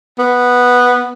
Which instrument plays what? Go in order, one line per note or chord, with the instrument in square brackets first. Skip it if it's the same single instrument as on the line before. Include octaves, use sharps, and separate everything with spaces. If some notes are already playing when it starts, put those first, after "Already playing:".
[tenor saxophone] B3